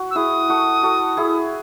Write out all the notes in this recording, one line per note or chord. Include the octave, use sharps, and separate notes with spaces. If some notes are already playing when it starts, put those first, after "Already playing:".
Already playing: F#4
E6
E4 G#4 D#6
F#4 A4
F#4 A4
E4 G#4